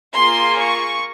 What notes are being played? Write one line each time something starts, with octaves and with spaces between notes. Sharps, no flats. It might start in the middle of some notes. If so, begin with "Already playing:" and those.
A#3 F4 G#4 C6
C#6